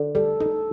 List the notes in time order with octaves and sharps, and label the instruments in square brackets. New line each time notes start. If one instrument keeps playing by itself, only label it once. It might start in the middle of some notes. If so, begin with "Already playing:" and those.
Already playing: [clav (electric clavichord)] D3
[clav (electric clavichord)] G3 [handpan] A4
[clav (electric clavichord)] D#4 [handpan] A4